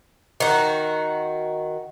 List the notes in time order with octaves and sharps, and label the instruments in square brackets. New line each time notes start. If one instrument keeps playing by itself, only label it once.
[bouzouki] D#3 F#4